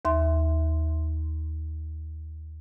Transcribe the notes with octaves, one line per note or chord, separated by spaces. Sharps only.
D#2 E5 C6